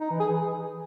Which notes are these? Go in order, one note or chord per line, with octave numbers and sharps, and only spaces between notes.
D#4
E3
G#4
E3